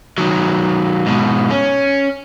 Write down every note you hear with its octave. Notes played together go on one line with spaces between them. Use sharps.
D#3 F#3
G#2 B2
C#4